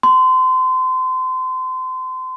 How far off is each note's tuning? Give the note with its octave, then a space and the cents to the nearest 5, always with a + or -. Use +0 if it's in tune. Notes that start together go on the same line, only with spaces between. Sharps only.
C6 -30